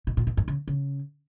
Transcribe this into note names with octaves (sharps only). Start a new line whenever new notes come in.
B2
A#2
B2
G2
C#3
C#3